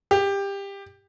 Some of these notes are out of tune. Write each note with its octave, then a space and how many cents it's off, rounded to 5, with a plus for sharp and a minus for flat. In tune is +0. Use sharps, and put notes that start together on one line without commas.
G4 +20